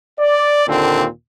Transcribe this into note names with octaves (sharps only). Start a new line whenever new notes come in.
D5
D#2 A#2 D3 C4